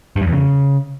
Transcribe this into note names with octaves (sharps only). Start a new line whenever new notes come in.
G2
F#2
E2
C#3